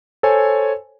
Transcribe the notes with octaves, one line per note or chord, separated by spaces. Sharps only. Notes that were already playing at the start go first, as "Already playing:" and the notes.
A4 C5 C#5 G#5